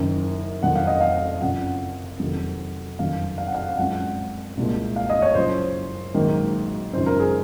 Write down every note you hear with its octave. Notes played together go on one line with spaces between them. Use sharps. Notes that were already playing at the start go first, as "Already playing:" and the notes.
Already playing: F#1 F#2 D#3
F1 F2 D#3 F#3 C4 F#5
F5
D#5
F5
F#1 F#2 F3 C4 F#5
F2 C3 D#3 F#3
F#1 F2 D#3 F#3 F5
F5
F#5
F5
F#2 F3 G#3 C4 F#5
C2 A#2 G#3
F5
D#5
C#5
F#1 F#2 F3 C5
A#1 G#2 D#3 F#3 A#3
G#1 F#2 C#3 F3 C5
A#4
G#4